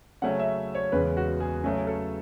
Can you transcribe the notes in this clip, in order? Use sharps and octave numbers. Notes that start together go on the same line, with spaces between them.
C#3 F#3 A3 C#4 F#5
E5
C#5
E2 C#3 G#3 C#4 B4
F#4
G#4
C#3 F#3 A3 C#4 G#4
A4